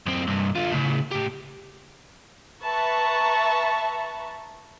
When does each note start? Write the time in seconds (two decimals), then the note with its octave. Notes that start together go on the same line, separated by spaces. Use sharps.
0.06 F#2 C4
0.27 C2 G2
0.55 D3 F4
0.72 A2 C#3
1.11 A2 G4
2.64 B4 E5 A5 A#5 C#6